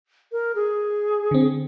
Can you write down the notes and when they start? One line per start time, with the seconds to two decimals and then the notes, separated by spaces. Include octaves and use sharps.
0.32 A#4
0.55 G#4
1.31 D3 C4